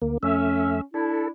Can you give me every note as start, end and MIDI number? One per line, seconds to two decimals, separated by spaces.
0.02 0.18 38
0.02 0.18 58
0.23 0.81 41
0.23 0.81 57
0.23 0.81 61
0.23 0.81 76
0.94 1.28 62
0.94 1.28 64
0.94 1.28 69